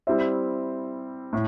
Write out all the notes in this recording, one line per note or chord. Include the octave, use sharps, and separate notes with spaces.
G3 C4 E4 C5 E5
A2